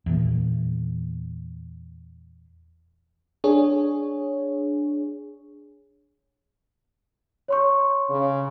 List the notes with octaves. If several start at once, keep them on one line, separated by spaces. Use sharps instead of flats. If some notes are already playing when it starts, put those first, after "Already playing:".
E2 A#2
D4 G#4 C#5
C#5 C6 C#6
C#3